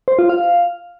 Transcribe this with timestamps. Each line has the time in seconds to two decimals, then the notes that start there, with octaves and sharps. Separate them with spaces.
0.08 C5
0.19 F4
0.29 F5